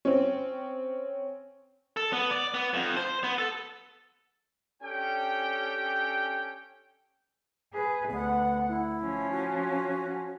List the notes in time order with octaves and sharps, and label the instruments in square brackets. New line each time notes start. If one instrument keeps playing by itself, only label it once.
[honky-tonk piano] C4 C#4
[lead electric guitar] A4
B3
D5
B3
F2
C5
B3
A4
[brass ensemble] C#4 D4 G4 A4 C#5 G5
[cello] G#4 B4
[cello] D2 F#5 [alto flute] B3
[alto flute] E4
[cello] F3 C#4
[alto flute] F#4